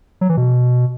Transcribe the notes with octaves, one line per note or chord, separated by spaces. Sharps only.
F#3
E3
B2